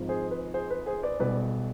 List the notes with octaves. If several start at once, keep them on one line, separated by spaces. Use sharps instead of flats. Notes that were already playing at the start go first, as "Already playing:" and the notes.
Already playing: G#1 G#2 F3
G#4 C5
B4
G#4 C5
B4
G#4 C5
B4 D5
B1 B2 G3 B4 D5